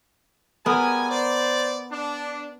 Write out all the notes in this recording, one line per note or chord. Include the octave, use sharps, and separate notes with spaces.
G3 G#3 B3 A#4 G#5
C5 D5
D4